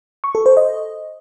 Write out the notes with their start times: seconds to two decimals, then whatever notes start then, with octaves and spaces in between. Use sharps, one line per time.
0.24 C#6
0.35 A4
0.46 C5
0.57 D#5